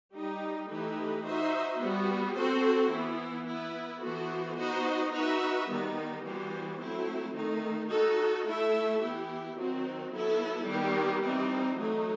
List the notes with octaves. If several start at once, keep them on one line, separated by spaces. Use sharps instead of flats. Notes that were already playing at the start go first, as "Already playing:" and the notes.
G3 D#4 G4
E3 A3 D#4 G4 B4
D#4 F#4 C5 E5
G3 B3 F#4
C4 F#4 A4 C5
E3 B3 E4
B3 E4 B4
E3 B3 F#4 A4 C5
B3 D#4 F#4 C5 D#5
D#4 F#4 B4 E5
D#3 G3 B3 D#4
E3 G3 B3 F#4 C5
F#3 A3 C4 E4
D#3 A3 D#4
D#4 F#4 A4
A3 E4 A4 E5
E3 B3 E4 G4
D#3 F#3 C4 F#4
F#3 B3 E4 A4
D#3 G3 B3 E4 G4
E3 G3 C4 D#4
F#3 A3 D#4